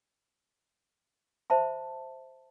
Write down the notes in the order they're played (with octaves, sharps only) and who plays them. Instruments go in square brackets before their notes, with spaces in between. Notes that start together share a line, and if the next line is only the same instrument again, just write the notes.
[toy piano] C5 E5 A5 B5